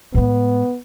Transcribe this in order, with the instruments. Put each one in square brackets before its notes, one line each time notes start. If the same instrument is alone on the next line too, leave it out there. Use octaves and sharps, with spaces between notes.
[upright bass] A2 G#3 [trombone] B3